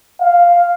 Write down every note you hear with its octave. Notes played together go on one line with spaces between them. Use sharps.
F5